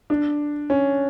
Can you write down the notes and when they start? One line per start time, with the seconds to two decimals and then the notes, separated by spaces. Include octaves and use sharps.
0.10 D4
0.70 C#4